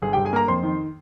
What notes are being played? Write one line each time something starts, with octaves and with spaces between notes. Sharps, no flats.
G1 G#4
G4 G5
G1
G#4 G#5
A#3 A#4 A#5
F2 C5 C6
D#3